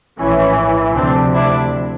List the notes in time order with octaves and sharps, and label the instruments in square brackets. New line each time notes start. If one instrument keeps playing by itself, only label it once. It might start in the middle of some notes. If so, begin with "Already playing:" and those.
[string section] A#1 A2 E3 C#4
D2 C3 F3 C4 D4
D4 E4